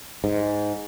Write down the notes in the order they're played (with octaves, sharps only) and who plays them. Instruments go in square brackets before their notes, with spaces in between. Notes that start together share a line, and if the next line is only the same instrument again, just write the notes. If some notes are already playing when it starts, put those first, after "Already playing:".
[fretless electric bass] G#2